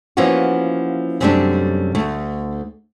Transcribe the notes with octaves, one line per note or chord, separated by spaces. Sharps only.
E3 F3 A#3 B3 C#4 F#4
F#2 C3 G3 A3 C#4 D4
D2 A3